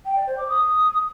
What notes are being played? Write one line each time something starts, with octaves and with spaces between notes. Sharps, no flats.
G5
D5
C5
D6
D#6